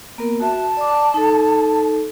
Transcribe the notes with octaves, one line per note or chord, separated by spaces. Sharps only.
A#3 B3 A#4
F#4 E5 A5
D5 D6
D#4 A4